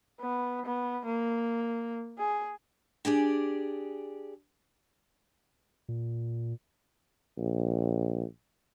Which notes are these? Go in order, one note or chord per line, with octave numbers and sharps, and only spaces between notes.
B3
B3
A#3
G#4
D4 G4 G#4 D5
A#2
A#1